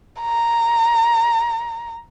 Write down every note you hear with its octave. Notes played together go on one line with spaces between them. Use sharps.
A#5